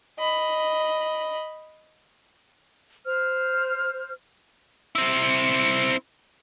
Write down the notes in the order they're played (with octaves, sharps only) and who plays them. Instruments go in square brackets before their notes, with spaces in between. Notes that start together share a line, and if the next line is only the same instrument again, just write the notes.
[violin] D#5 B5
[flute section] C5 F6
[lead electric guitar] C4 E4